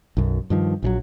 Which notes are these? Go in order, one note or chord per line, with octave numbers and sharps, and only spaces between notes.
B1 F#2
G2 D#3 F3
A#1 F3 F#3